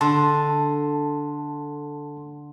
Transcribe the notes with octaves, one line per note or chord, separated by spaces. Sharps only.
D3 A5 C6